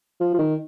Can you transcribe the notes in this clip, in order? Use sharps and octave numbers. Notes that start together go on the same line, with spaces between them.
F3
F3
D#3